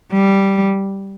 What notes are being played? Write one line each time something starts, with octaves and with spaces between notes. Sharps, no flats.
G3